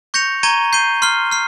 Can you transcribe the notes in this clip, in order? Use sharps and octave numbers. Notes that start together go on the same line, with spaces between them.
C#6 G6 A#6 C#7 F7
A#5 C#6 G#6 D#7 G7
G6 C7 D#7 G7
C6 F6 C7 G7
F6 C7